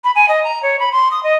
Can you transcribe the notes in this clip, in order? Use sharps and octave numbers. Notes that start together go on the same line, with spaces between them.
B5
G#5
D#5
A#5
C#5
B5
C6
D#6
D#5